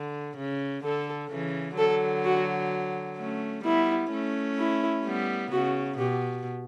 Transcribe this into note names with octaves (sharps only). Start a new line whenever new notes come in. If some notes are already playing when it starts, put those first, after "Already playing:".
Already playing: D3
C#3
D3 A4
C#3 E3
D3 F#3 A4
F#4
A3 C#4
G3 B3 E4
A3 C#4
E4
G3 B3
C#3 F#4
B2 G4